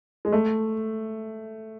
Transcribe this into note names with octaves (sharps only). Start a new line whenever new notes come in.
G#3
A3